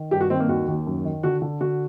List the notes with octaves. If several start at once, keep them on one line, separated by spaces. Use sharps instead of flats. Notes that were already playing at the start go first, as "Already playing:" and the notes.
Already playing: D#3
G2 G4
F#4
D#3 C4
A#3
D#2 F#4
D#2
F#2
D#3
D3 F#4
D3
D3 F#4